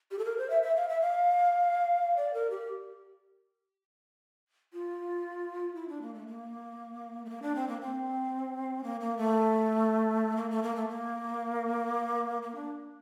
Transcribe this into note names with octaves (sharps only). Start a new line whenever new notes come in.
G4
A4
A#4
C5
E5
E5
F5
E5
F5
D5
A#4
G4
F4
E4
D4
A#3
A3
A#3
A3
A#3
D4
C4
A#3
C4
A#3
A#3
A3
A#3
A3
A#3
A3
A#3
A#3
D4